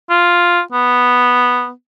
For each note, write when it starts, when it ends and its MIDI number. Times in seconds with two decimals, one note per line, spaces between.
0.10 0.61 65
0.72 1.71 59